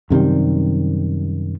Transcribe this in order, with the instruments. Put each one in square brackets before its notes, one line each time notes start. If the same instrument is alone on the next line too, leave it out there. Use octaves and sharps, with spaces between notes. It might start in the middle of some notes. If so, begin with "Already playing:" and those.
[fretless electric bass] F#2 C3 D#3 G3